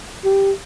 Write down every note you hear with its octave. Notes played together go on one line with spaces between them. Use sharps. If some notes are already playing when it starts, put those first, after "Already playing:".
G4